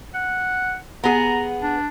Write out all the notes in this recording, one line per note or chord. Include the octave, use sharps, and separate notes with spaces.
F#5
B3 G#4 A#5
D4